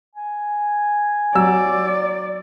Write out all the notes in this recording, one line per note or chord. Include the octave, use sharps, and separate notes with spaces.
G#5
F#3 D5 E6